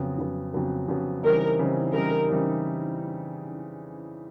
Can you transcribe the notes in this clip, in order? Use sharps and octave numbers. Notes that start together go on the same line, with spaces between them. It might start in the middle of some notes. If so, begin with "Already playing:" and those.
Already playing: F2 C#3 F#3 B3
F2 C#3 F#3 B3
F2 C#3 F#3 B3
F2 C#3 F#3 B3
C#3 E3 G3 C4 D#4 A#4
C#3 E3 G3 C4 D#4
C#3 E3 G3 C4 D#4 A#4
C#3 E3 G3 C4 D#4